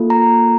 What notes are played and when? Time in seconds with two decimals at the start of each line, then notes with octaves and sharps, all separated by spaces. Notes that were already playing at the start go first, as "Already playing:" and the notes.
Already playing: A#3 F4 A4
0.10 A#5